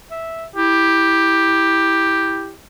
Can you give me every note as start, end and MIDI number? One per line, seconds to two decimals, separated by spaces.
0.11 0.45 76
0.56 2.52 64
0.56 2.54 67